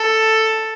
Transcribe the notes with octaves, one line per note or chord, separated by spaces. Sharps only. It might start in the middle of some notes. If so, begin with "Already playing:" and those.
Already playing: A4